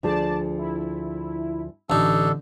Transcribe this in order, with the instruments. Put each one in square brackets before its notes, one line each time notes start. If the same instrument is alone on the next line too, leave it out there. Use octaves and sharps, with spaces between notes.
[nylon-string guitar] D2 F3 G#4 [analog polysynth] D5 A5
[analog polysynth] E4
[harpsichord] A1 D#4 [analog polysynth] D3 [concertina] D4 A4